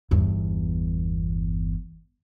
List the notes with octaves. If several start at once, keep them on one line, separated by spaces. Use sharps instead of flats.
G1 E2